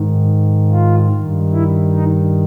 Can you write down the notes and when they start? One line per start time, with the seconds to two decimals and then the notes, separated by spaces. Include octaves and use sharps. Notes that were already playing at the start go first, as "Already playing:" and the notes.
Already playing: G#2 D#3
0.71 F4
1.11 G2 D#3
1.51 E4
1.92 D#4